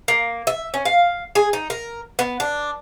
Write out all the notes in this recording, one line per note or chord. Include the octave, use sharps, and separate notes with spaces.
A#3
E5
C#4
F5
G#4
D#4
A#4
B3
D4